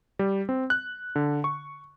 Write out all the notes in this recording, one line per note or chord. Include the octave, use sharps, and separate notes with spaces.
G3
C4
F#6
D3
C#6